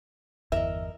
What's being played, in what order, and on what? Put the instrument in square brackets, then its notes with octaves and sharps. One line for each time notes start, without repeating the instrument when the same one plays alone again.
[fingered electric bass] G1 E2 E3 [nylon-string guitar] A#4 D#5 [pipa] E5